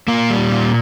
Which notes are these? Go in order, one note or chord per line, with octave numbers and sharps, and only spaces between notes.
A#2 A#3
G3
A#2